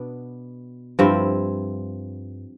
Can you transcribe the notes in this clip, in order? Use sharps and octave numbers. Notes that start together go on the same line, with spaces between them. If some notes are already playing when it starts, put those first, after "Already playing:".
Already playing: B2 B3 D4
G2 F3 C4 E4